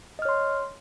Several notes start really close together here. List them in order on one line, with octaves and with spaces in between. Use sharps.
D#5 F6 C#5 C6